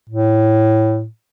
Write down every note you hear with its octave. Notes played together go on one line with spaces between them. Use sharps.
A2